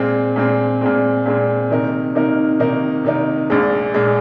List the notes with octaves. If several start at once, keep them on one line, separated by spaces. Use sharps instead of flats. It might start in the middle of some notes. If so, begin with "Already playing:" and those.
Already playing: A#2 G#3 C4
A#2 G#3 C4
A#2 G#3 C4
A#2 G#3 C4
C3 D#3 A#3 D#4 A#4
C3 D#3 A#3 D#4 A#4
C3 D#3 A#3 D#4 A#4
C3 D#3 A#3 D#4 A#4
A#1 A#2 G#3
A#2 G#3